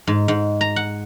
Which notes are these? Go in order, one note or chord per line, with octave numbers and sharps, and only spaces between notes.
G#2
G#2
A#5
F#5